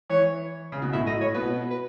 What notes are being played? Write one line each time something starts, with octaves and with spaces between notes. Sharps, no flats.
E3 C#5
C#3
B2
A2 E5
A2 D#5
A2 C#5
B2 B4
B4